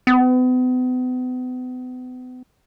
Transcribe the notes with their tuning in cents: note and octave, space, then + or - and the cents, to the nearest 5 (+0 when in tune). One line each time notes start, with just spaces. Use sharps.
B3 +40